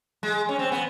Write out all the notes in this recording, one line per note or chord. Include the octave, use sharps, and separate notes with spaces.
G#3
C#4
C4
B3